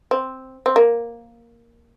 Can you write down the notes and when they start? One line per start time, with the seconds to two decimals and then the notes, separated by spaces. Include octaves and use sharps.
0.11 C4
0.66 C4
0.76 A#3